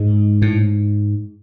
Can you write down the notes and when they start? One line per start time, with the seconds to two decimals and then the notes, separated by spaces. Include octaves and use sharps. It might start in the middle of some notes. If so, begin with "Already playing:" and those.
Already playing: G#2 G#3
0.42 A2